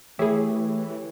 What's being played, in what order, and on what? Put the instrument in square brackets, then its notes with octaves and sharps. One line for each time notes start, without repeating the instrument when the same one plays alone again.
[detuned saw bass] E3 [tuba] A3 [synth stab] E4 G#4 [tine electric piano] G4 C#5